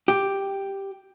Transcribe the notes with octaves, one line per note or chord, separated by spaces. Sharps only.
G4